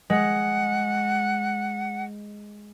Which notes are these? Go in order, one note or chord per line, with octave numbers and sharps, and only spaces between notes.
G#3 F#5